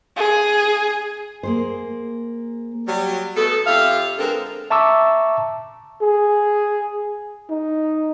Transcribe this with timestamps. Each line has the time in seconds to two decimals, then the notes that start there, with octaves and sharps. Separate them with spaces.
0.17 G#4
1.43 A#3 G#4 C5
2.87 F#3 G3
3.36 B2 A3 G#4 A4
3.66 F2 F4 G4 E5 F5
4.18 D3 G#3 B3 C4 A4 A#4
4.70 E5 A5 A#5 C#6 D6 E6
6.02 G#4
7.50 D#4